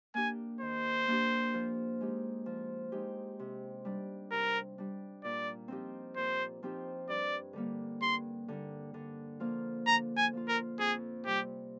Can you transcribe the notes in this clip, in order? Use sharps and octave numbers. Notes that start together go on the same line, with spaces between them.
A#3 D4 G4 G#5
D#3 C5
A#3 D4 G4
F3
G#3 D#4 G4
F3
G#3 D#4 G4
C3
G3 D4
C3 A#4
G3 D4
A#2 D5
F3 C4 D#4 G4
A#2 C5
F3 C4 D#4 G4
G2 D5
D3 G3 A#3
G2 C6
D3 G3 A#3
D3
F3 A#3 F4
D3 A#5
G#5
F3 A#3 F4
A#4
F2 G#4
C3 G3 G4